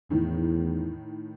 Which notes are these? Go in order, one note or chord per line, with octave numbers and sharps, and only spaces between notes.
E2 A2 D#3